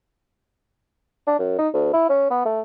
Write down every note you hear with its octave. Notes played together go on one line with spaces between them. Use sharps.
D4
F#2
D#4
D2
E4
C#4
B3
A3